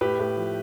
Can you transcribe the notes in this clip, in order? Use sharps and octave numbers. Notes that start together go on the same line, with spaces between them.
A2 G4 B4
A2
F3